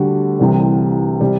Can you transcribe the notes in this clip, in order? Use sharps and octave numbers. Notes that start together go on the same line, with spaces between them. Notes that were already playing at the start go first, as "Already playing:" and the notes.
Already playing: D2 D3 G3 F#4
C2 C3 E3 G3
C3 G3